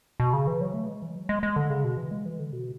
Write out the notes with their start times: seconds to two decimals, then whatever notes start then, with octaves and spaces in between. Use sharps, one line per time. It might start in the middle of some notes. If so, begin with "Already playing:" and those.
0.20 B2
0.33 C#3
0.47 E3
0.61 F#3
0.74 A3
0.88 G#3
1.02 E3
1.16 F#3
1.29 G#3
1.43 G#3
1.56 D3
1.70 C#3
1.84 B2
1.97 E3
2.11 G#3
2.25 E3
2.39 D3
2.53 B2